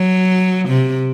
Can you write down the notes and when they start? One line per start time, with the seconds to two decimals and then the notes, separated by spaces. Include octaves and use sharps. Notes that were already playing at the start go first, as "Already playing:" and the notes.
Already playing: F#3
0.69 C3